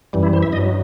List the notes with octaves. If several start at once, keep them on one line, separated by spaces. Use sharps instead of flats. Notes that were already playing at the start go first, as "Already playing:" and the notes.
F#2 E3 G3
E4
C5
E5
G2 F#3 D#5